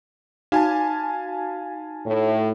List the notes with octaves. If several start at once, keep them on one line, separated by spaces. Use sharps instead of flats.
D#4 F#4 F5 G#5 A5
A2